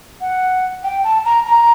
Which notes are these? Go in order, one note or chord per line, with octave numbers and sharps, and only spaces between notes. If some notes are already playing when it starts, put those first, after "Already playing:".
F#5
G5
A5
A#5
A#5